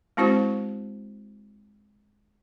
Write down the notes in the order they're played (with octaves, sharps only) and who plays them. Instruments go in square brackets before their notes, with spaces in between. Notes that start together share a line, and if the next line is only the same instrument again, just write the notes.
[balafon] G#3 C4 E4 F#4 C5